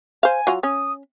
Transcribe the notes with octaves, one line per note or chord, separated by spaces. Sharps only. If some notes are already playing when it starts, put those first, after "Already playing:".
C5 F5 G#5
F#3 F4
C#4 D#6